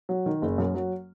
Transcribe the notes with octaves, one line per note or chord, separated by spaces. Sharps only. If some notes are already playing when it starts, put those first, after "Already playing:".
F#3
D#3
F#1
F#2
F#3